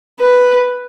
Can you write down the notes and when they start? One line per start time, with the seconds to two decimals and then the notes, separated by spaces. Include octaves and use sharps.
0.19 B4